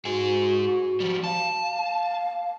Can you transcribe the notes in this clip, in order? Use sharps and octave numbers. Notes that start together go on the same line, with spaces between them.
G#2 F#4 G#4
F3 G3
F5 A5
F5